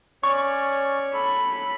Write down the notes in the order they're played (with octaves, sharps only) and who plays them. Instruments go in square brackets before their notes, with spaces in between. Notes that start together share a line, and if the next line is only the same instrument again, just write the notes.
[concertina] C#4 D5 [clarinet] C#5 [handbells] C#6
[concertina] A4 [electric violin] B5